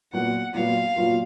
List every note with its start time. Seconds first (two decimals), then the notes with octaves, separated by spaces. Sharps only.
0.13 A#2 F#3 B3 F4 F#5
0.54 A#2 F#3 B3 F4 F5
0.96 A#2 F#3 B3 F4